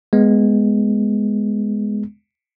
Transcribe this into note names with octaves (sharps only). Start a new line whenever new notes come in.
G#3 B3